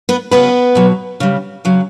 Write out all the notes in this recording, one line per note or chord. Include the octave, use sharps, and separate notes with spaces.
B3 B4
C#3 F#3 B3 B4
B2 F#3
C#3 G3
C#3 F#3